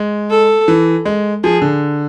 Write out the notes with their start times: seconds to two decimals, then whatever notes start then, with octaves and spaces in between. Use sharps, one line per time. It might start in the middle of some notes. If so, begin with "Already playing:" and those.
Already playing: G#3
0.30 A4
0.68 E3
1.05 G#3
1.44 F3 G#4
1.61 D3